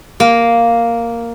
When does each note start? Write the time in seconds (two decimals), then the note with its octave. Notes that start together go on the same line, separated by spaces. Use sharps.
0.20 A#3